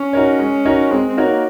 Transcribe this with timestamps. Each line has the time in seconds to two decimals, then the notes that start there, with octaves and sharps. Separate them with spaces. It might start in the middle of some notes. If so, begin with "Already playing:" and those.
Already playing: C#4
0.13 D#4 F#4 A#4 C#5
0.39 G#3
0.65 D#4 F#4 A#4 C#5
0.91 G#3 C4
1.08 C4
1.17 D#4 F#4 A#4 C#5
1.26 A#3